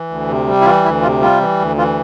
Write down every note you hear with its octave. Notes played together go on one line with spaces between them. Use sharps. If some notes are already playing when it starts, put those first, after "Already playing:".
Already playing: E3
D2
C3
G3
E4
E3 F4
D2 E4
C3 F4
G3 F4
E3
D2
E3 F4